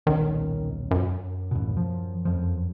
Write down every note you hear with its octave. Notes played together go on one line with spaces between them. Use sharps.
D#1 B1 D#3 C#4
F#2
A1 D#2 B2
F3
F2 F3